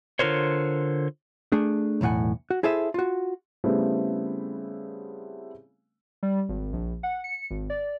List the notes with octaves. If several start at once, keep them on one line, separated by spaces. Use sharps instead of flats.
D3 F4 A4 A#4 C5 C#5
A3 D4 G#4
B1 E2 A2 F#5 G#5
F#4
E4 G#4 A4 C5 E5
F4 F#4
C#3 G3 A3 B3 C4 E4
G3
G#1
A#1
F#5
C#7
G#1
D5